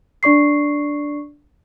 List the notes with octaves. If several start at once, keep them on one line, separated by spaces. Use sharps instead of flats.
D4 D5 C#6 C7